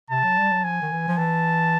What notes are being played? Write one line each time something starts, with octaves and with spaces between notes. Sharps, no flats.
C3 A5
F#3
G3
F#3
F3 G#5
D#3
E3
F3
E3 A5